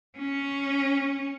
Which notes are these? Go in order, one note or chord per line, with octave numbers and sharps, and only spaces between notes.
C#4